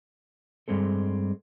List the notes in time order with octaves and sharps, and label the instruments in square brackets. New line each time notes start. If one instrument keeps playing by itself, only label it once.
[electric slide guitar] G2 G3 G#3 C4 A4